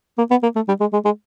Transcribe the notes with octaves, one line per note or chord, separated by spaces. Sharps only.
A#3
B3
A#3
A3
G3
G#3
G#3
G#3